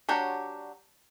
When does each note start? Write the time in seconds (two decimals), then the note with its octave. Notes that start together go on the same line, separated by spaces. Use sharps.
0.08 F#3 D4 F#4 G4 C#5